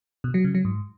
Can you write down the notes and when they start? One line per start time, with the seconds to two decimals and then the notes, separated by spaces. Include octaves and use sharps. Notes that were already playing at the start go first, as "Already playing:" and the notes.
0.24 B2
0.34 F#3
0.44 C#3
0.55 F#3
0.65 G#2